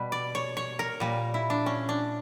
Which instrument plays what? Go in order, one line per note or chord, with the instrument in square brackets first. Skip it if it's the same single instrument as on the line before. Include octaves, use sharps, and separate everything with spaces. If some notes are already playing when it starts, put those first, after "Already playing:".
Already playing: [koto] B2 G3 B4
D5
C#5
C#5
A#4
A#2 G3
E4
D4
C#4
D4